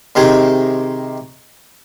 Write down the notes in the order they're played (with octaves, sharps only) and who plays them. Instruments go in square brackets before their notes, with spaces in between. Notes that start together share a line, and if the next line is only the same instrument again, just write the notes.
[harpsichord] C3 D#3 G#3